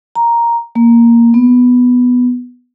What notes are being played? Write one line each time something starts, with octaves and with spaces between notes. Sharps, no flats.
A#5
A#3
B3